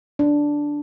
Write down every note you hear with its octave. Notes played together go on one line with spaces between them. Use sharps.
D4